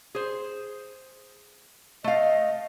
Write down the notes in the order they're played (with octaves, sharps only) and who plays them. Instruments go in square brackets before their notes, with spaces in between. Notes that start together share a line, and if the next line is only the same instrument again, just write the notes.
[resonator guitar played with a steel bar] G#4 C5
[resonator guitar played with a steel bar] A3 F5 [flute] D#5